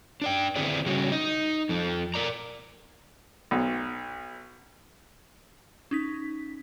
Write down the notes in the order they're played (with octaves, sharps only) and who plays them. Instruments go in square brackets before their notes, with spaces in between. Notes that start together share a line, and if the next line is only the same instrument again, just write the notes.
[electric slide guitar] D4 D5 G5
D3 C4 E4 G#4 D5
C#3 G3 C#4 F#4
D#4 D#5
F2 F3
A#4 D5 A#5
[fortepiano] B1
[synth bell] C#4 D#4 B6